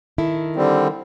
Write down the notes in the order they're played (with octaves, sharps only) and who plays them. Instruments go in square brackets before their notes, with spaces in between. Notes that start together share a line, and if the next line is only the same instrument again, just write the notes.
[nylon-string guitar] D#3 E4 A4
[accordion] D3 G3 C4